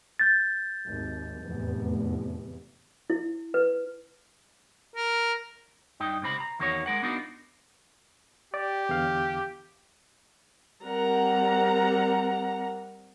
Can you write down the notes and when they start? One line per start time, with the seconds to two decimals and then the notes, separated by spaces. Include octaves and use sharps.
0.19 G6 A6
0.85 G#1 D#2
1.44 F1 E2 A2
3.10 E4
3.54 B4
4.96 A#4
6.00 G2 D#4 G5
6.22 C#2 C3 C4 B5
6.40 A#5
6.59 E2 D#3 A#3 F#4 B4 C#5
6.86 G#3 A#4 F#5
7.02 B3 D4 D#4 F4 F#4 A#4
8.54 G4 D5
8.89 E2 D3 F5
10.83 G3 C4 A#4 F#5 A#5